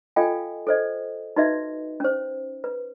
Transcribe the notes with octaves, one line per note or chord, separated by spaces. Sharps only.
F4 A4 D#5 F5 G5 G#5
A4 C5 D#5
D#4 F#4 B4 D#5 E5
C#4 C5
B4